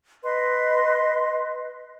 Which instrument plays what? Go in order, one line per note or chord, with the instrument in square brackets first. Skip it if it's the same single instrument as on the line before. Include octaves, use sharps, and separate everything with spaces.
[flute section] B4 D#5 C6